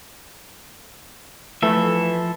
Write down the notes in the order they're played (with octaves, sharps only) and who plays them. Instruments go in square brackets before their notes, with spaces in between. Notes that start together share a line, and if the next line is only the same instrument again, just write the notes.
[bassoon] E3 [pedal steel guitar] F3 A4 E5 [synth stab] A3